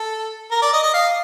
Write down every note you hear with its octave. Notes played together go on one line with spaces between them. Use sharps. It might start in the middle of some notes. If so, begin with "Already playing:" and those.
Already playing: A4
A#4
D5
D#5
D#5
F5